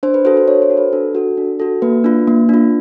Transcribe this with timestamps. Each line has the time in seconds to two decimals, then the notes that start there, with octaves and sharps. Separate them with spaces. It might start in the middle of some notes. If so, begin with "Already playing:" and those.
0.03 D4 C5
0.14 B4
0.25 F#4 A4 C5
0.37 C5
0.48 D4 C#5
0.62 C5
0.70 F#4 A4
0.77 B4
0.93 D4 A4
1.15 F#4 A4
1.37 D4
1.60 F#4 A4
1.82 A#3 B4
2.04 D4 F4
2.28 A#3
2.49 D4 F4